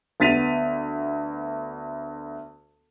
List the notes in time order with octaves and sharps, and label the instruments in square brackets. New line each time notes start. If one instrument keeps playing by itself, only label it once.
[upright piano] D2 B3 A6 B6 D#7 F7